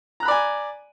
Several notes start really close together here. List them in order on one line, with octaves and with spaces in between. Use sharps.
A#5 F#6 B5 D5 G#5